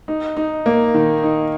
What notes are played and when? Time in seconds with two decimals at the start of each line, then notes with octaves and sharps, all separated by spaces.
0.08 D#4
0.37 D#4
0.66 A#3
0.94 D#3
1.23 D#4